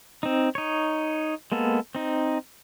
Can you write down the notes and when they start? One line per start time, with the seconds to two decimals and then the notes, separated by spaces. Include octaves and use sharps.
0.23 C4 D#4
0.55 D#4 C#5
1.52 G#3 A#3 B3 A4
1.95 C4 D#4